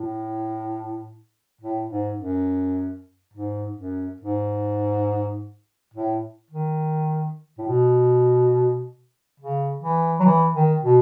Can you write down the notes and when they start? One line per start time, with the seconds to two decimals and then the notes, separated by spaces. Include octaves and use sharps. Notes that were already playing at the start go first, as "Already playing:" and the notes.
Already playing: A2
1.61 A2
1.89 G#2
2.18 F#2
3.34 G#2
3.77 F#2
4.21 G#2
5.94 A2
6.51 D#3
7.58 A2
7.67 B2
9.40 C#3
9.83 E3
10.20 F#3
10.26 E3
10.54 D#3
10.83 B2